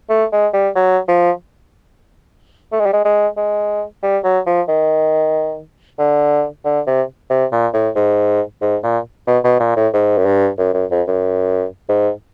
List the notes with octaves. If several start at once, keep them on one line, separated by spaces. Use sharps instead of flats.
A3
G#3
G3
F#3
F3
A3
G#3
G3
G#3
G#3
G#3
G3
F#3
F3
D#3
D3
D3
C3
C3
A#2
A2
G#2
G#2
A#2
B2
B2
A#2
A2
G#2
F#2
G2
F#2
F#2
F2
F#2
G#2